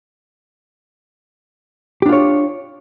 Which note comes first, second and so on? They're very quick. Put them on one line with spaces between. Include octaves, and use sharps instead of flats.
G4 D4 F4 C#5